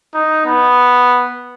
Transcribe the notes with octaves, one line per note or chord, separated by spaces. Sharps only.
D#4
B3